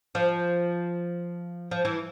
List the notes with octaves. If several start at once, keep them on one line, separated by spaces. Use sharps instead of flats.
F3
F3
E3